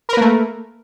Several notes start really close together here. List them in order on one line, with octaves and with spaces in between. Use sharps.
A#4 B4 A#3 A3